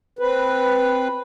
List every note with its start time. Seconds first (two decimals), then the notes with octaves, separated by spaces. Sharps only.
0.19 C4 B4